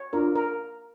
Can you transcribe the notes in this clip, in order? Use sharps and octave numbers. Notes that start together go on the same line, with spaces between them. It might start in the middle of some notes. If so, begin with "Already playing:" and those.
Already playing: C#5
D4 F4 A#4
A#4